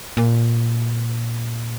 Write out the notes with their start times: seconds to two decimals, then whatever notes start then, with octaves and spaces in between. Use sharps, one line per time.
0.17 A#2